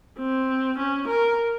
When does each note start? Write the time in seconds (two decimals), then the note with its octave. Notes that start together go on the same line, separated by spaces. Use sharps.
0.19 C4
0.78 C#4
1.08 A#4